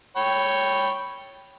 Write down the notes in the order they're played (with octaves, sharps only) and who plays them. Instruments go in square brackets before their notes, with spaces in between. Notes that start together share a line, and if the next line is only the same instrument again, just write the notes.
[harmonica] C#5 G5 B5